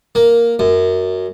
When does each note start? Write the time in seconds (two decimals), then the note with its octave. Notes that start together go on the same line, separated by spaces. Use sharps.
0.15 A#3
0.59 F#2